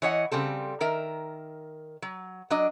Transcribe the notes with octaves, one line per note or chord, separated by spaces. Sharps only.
E3 C#5 D#5 F#5
C#3 G3 C4 A4
D#3 A#4 E5
F#3
F#3 D4 D#5